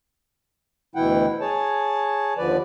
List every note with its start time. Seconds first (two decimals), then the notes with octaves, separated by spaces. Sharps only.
0.95 D2 B2 E3 E4 F#5 G5
1.41 G#4 C#5 A5
2.38 D#2 D3 F3 B4 D5